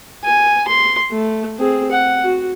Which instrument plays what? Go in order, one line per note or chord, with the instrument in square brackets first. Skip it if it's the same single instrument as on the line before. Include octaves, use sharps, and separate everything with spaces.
[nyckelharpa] G#5
C6
A3
C4 G#4
F#5
F#4